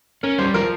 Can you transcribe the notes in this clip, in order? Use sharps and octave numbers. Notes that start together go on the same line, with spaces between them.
C#4 A#4
G3 C5
F3 A#4